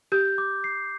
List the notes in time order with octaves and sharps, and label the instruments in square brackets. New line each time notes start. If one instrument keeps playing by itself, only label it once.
[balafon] G4 [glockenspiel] G6
[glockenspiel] D6
C7